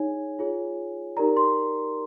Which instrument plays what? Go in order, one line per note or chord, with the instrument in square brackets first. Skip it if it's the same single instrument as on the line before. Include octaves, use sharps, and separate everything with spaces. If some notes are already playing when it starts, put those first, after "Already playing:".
Already playing: [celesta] D#4 G#4 C#5 G#5
F4 G#4 C#5
D#4 G4 A#4 D5 A#5
C6